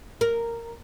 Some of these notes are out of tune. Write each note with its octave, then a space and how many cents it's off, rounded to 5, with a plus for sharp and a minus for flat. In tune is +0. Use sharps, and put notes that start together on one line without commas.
A#4 -10